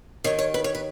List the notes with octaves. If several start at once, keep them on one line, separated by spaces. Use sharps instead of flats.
D#2 D#3 C#5
C#5
B4
C#5
B4